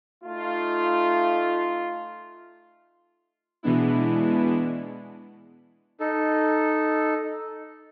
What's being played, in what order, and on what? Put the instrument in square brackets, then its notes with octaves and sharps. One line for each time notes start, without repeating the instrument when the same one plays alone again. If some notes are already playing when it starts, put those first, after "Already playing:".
[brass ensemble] A3 D#4 F4
[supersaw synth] B2 E3 G#3 B3 D4 E4
[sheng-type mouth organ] D#4 A4